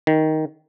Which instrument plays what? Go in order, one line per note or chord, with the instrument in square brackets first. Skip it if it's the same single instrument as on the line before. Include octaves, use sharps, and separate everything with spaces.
[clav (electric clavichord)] D#3